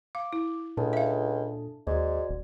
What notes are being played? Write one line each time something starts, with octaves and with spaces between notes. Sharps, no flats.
F5 D6
E4
C#2 A#2 D4 A4 A5
E5 F5
D#2 G#2 F#4 D5
D#1